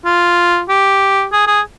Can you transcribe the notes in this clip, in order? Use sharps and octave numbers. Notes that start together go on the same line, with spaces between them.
F4
G4
G#4
G#4